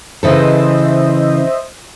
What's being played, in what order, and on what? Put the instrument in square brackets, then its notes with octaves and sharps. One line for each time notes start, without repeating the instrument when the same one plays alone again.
[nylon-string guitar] C#3 E3 A4 [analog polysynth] C5 D#5 E5